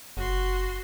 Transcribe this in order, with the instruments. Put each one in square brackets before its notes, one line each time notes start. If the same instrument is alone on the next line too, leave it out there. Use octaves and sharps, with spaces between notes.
[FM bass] F#1 [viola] F#4 C6